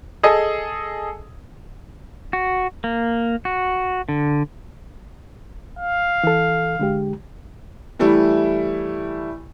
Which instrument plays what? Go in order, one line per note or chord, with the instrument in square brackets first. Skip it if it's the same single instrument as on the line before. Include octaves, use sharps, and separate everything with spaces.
[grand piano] G#4 A4 D#5
[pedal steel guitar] F#4
A#3
F#4
D3
[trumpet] F5
[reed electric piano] E3 A4
D3 G#3 G4
[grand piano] E3 G3 A3 E4